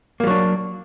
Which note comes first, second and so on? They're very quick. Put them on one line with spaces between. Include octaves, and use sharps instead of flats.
A#3 G3 F#3 D4